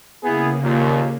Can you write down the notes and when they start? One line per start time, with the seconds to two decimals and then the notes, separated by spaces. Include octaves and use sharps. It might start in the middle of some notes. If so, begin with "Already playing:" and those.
0.23 C#3 A#3 B3 E4 G#4
0.63 D#2 A#2